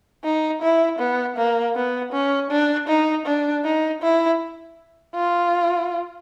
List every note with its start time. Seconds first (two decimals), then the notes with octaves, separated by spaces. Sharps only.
0.24 D#4
0.62 E4
0.99 B3
1.37 A#3
1.75 B3
2.12 C#4
2.50 D4
2.88 D#4
3.26 D4
3.64 D#4
4.02 E4
5.15 F4